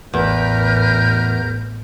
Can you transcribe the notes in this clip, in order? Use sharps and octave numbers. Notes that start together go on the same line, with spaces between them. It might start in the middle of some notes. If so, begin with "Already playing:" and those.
A1 E2 A#4 B4 G6